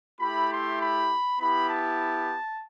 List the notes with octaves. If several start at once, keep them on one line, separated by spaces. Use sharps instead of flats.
A3 E4 G4 B5
C6
B5
B3 E4 G4 B5
A5